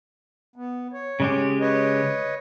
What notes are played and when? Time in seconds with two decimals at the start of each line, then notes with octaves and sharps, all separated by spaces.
0.56 B3
0.93 C#5
1.20 C#3 G#3 G4
1.60 B4 C#5 D#5